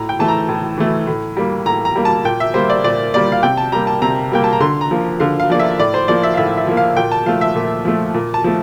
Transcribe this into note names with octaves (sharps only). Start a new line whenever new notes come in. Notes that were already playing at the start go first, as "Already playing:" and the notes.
Already playing: A2 A#5
G5
E3 A3 A5
A#5
A2
E3 A3
A2
G3 A#3
A2 A#5
A#5
G3 A#3
A5
A#2 G5
E5
G3 A#3 C5
D5
A#2 D5
G3 A#3 D5
F5
C3 G5
A5
G3 A#3 A#5
A5
C3 A#5
G3 A#3 G5
A5
A#5
D3 C6
A#5
F3 A#3
D3 F5
F5
F3 A#3 D5
E5
A2 D5
C5
F3 A#3 D5
E5
F5
A2 E5
E5
F3 A#3
F5
A#2 G5
A5
F3 A3 F5
E5
A#2
F3 A3
A#2
A5
F3 A3